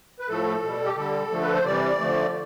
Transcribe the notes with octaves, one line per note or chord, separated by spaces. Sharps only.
B4
A2 F3 A3 A4
B2 G3
G4
D3 G3 A4
D3 F3 A3
B4
C5
C3 E3 G3 D5
D3 F3 A3